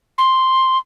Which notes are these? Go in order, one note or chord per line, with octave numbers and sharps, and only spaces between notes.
C6